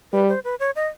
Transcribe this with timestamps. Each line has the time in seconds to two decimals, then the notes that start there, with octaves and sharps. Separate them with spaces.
0.12 G3 B4
0.28 C5
0.44 B4
0.60 C#5
0.76 D#5